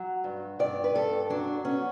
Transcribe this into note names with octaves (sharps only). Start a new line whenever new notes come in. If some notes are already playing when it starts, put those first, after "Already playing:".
Already playing: F#3
G2
G2 D5
B4
G2 A4
F#3 D4
B3 C#4